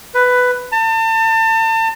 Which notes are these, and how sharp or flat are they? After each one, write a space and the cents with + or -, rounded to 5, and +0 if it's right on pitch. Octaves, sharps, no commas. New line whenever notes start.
B4 +10
A5 +35